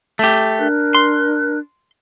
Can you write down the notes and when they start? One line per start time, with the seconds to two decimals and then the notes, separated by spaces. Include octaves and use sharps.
0.19 A3 G4
0.57 D4 A#4 F#6
0.95 C6